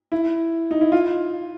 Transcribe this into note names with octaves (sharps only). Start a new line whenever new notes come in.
E4
D#4
E4
F4